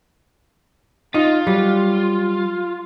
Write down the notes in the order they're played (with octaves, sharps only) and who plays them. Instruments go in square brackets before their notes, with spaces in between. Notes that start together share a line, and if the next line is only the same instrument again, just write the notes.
[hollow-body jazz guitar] D#4 [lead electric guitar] F4
[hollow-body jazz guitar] F#3 G3